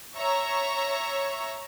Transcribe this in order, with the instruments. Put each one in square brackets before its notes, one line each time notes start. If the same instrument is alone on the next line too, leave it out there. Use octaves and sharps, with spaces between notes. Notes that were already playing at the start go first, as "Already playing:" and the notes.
[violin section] C#5 E5 A#5 C#6